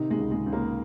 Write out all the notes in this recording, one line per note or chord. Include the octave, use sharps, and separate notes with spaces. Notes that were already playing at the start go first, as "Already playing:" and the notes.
Already playing: C3 D#3 D#4
G#3 G#4
C#2
G#3 G#4
C#2
A#3 A#4